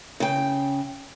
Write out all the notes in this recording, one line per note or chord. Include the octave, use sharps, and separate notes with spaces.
C#3 G5